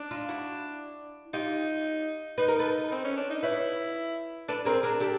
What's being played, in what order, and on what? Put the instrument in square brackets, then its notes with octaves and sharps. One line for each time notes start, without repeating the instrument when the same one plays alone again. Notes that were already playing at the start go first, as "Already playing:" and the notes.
Already playing: [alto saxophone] D4
[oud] D#4 F4
E4 F#4
[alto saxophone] D#4 [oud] F4 G4
[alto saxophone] D#4 [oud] B4
[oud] A#4
A4 B4
[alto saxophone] C4
C#4
D4
D#4
[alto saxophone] E4 [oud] B4 C#5
[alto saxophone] D4 [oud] A4 B4
[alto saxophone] C4 [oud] G#4 A#4
[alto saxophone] D4 [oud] G#4 A#4
[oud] G4 A4